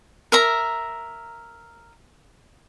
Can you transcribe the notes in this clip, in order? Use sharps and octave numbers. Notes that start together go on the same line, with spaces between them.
A#4 E5 A#5